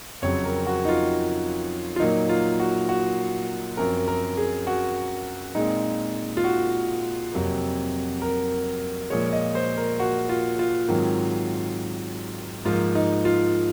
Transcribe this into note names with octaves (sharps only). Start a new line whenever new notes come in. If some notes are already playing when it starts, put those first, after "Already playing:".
F2 C#3 F#3 C4 C#5
A#4
F#4
D#4
F4
F4
A#2 F#3 A#3 D#4
F4
F#4
F#4
F#2 F3 C4 A#4
A#4
G#4
F#4
A#2 G#3 C4 D#4
F4
F#4
F2 C3 F#3 A#3
A#4
A#2 F3 G#3 C#5
D#5
C5
A#4
F#4
F4
F4
G#2 D#3 F#3 C4
G#2 F3 A#3 F4
D#4
F4